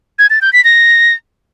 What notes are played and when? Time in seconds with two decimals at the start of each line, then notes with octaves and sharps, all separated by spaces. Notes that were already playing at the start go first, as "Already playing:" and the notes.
0.19 G#6
0.30 A6
0.42 G6
0.53 B6
0.64 A#6